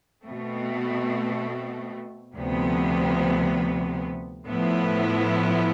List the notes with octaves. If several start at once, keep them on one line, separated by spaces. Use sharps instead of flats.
B2 A3 C4
D2 C3 F3 B3
A2 F3 B3 E4